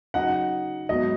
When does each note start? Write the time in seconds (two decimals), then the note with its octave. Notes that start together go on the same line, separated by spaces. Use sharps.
0.14 C#3 F#3 D#4 F#5
0.89 G#2 F#3 B3 F#4 D#5